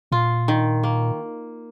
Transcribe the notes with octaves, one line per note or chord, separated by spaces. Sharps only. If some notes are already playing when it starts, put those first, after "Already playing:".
A#2 F4
D#3
A#3